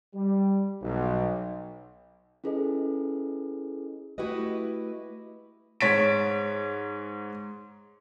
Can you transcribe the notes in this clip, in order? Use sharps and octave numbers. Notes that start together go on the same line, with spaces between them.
G3
B1
C#4 E4 G#4 A4 B4 D#5
A3 E4 F#4 G4 B4 D#5
G#2 C#5 A6 B6 D7